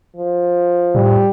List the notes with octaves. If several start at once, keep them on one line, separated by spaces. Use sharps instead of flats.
F3
A2 G3